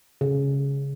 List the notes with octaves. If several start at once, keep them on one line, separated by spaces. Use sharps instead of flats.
C#3